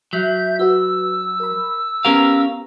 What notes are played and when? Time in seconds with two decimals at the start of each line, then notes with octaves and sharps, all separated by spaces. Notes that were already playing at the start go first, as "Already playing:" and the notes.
0.13 F#3 E5 G6
0.59 F#4 B4 E6
1.40 A#4 B5
2.05 B3 C#4 G4 A#4 F5 A#5